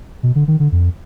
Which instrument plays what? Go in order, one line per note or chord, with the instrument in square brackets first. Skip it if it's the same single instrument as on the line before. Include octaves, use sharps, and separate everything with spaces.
[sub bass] B2
D3
D#3
D3
F2